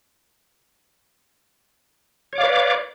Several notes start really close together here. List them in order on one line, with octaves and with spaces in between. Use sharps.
C#5 D6 F5 D5 B4